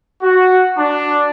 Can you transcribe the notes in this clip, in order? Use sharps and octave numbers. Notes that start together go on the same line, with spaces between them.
F#4
D4